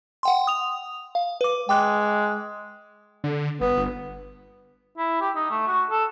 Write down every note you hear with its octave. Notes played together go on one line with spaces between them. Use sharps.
F#5 G5 C6
D#6 F7
F5
B4 D6
G#3 G5 D6 F#6
D3
G1 B3
G1
E4
G4
D#4
A3
F#4
A4